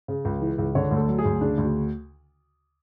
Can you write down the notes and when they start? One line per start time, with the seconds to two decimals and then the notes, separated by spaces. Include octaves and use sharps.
0.08 C#3
0.25 C#2
0.41 E3
0.58 C#2
0.75 D3 C#5
0.91 D2
0.96 A4
1.08 F#3
1.19 G#4
1.25 D2
1.41 C#3 D4
1.58 D2
1.64 F#4